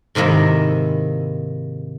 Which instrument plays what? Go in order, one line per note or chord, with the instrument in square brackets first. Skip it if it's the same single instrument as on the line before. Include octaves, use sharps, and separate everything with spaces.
[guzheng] G#2 C3 D#3 A#3 E4